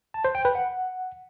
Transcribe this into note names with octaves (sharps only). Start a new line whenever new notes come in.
A5
C5
G5
B4
F#5